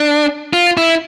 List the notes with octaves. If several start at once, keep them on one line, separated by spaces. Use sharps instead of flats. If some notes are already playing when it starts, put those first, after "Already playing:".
Already playing: D4
F4
E4